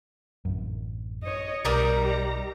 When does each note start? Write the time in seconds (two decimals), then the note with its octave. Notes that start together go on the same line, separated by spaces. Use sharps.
0.45 A1 F#2
1.23 C#5 D#5
1.65 B1 G3 D#4 A#4 D5 A#5